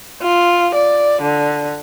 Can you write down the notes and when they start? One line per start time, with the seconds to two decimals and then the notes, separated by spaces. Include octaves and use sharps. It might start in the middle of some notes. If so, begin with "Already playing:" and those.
0.23 F4
0.75 D5
1.22 D3